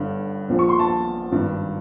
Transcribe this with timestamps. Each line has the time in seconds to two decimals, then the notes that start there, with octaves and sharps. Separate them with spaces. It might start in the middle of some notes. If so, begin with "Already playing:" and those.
Already playing: G1 G2 D3
0.48 A#1 A#2 F3
0.59 C#6
0.69 C6
0.79 A5
1.32 G#1 G2 D#3